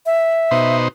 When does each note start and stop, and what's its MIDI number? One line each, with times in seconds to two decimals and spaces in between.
0.06 0.77 76
0.51 0.88 47
0.51 0.88 63
0.51 0.88 72